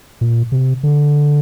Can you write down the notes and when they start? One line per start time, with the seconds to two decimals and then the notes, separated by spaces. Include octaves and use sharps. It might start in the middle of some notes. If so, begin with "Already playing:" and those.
0.21 A#2
0.52 C3
0.83 D3